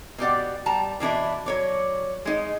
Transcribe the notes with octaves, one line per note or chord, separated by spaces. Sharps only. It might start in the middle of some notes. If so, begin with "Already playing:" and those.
B2 G4 D5 F#5
G3 A5 A#5
B2 E3 D4 E4
F#3 C#5 D5
G#3 D#4